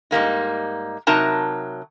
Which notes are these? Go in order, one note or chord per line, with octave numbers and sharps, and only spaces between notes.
G#2 G3 A#3 D#4
C3 F#3 D#4 A#4 A5 A#5